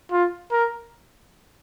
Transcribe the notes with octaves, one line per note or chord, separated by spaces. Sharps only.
F4
A#4